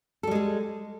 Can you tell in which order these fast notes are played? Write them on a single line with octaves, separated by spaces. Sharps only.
A4 G3 G#3 G#4